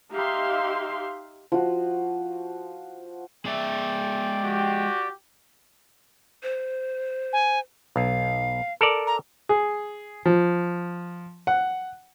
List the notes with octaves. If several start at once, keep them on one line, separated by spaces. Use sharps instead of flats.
D#4 G4 E5 F5 C6
F3 F#4
G#3 D5 E5 G5
F#4 G4
C5
G#5
B1 F5
A4 A#4 D5
A#5
G#4
F3
F#5